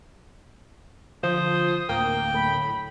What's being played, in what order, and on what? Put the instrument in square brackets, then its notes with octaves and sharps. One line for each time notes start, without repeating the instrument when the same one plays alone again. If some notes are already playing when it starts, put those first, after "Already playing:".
[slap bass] D3 [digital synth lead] F3 [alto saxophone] C5 [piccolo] D#6
[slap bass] D1 D2 [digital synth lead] A#3 [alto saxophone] G5
[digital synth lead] A2 [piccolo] B5